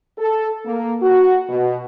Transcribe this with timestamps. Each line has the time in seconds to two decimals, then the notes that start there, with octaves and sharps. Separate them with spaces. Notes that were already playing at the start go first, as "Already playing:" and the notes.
0.18 A4
0.65 A#3
1.02 F#4
1.49 B2